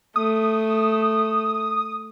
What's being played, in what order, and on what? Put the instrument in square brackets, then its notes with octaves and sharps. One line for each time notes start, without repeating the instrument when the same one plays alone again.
[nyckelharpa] A3 [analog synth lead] D#6